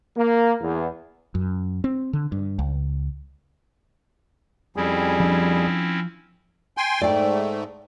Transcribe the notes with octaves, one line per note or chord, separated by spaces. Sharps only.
A#3
E2
F#2
C4
D3
G2
C#2
F2 G3 C4 C#4 E4 G#4
F3 D4
G5 G#5 C6
G#2 A3 D5 G5